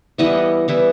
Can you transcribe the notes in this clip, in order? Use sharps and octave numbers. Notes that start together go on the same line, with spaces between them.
E3 G3 B3 E4 D#5 F#5
E3 G3 B3 E4